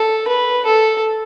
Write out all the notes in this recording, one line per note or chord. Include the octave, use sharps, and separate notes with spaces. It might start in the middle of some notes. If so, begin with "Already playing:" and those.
Already playing: A4
B4
A4